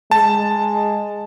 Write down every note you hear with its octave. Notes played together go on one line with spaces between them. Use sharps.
G#3 A5